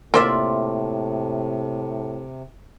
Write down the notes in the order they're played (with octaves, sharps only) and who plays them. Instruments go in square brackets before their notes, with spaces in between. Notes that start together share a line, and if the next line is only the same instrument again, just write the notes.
[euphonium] A2 [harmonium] C3 [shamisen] A#3 C5 [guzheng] F4 D5 E5